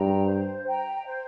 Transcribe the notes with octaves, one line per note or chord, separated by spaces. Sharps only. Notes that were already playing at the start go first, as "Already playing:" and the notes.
Already playing: G2 G5 A#5
C5
G5 A#5
C5